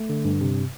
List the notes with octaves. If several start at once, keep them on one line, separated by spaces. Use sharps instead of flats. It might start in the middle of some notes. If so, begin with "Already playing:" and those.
Already playing: A3
D3
G2
C3